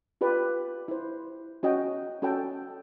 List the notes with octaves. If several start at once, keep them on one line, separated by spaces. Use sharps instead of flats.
F4 G4 B4 D5
E4 C5
C#4 F#4 D#5 G5
C#4 F#4 A4 D5 G5